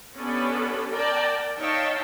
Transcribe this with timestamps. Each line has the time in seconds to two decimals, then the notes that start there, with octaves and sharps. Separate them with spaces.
0.16 B3 C#4 D4 G4 A4 B4
0.92 A#4 D5 G5 A5
1.58 D#4 C#5 E5 F5 G5 A5